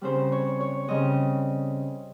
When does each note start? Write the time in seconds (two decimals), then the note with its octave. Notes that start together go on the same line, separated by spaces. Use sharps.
0.01 C#3 G3 C4 C5
0.32 C#5
0.61 C#5
0.88 C#3 G3 C4 D#5